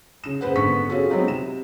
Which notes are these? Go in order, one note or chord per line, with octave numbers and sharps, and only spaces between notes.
C#3 E7
F#1 G#4 B4 C5 F#5
G#1 D3 B3 C#6 B6
C#4 F4 F#4 G#4 A4
F#3 G#3 B3 C4 D#4 F4
C3 E7